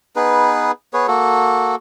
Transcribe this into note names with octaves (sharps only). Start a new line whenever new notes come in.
B3 D#4 G#4 B4
B3 G#4 B4 C#5
A#3 F#4 A4